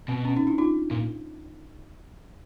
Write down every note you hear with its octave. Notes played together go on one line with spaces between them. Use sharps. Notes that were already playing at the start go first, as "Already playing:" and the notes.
B2 C4
C#4
C#4 D#4
D4 E4
D#4 F4
A#2